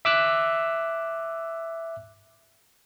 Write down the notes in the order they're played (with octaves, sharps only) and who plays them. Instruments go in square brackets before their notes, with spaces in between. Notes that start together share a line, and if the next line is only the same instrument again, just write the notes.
[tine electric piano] E5 D6 E6 F#6